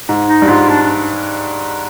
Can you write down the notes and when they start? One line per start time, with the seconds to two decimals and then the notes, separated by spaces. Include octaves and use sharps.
0.09 G#2
0.29 D#4
0.42 G2
0.49 G#2 F4
0.69 D4
0.83 D4